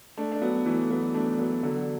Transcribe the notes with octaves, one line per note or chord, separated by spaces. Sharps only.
A3 D4
D4
F#3 B3
E3 A3
F#3 B3
A3 D4
F#3 B3
D3 F#3